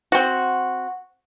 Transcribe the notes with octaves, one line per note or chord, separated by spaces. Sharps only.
C4 F#4